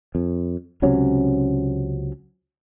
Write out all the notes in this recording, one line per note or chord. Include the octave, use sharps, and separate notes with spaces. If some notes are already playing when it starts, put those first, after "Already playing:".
F2
C#2 C3 F#3 C#4